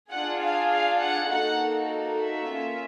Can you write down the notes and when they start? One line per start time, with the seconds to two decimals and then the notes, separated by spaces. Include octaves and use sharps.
0.10 D4 F4 G#4 F#5
0.40 F5
0.71 F5
1.00 F#5
1.30 A#3 D#4 F#4 A4 F#5
2.20 E5
2.49 A#3 C#4 F4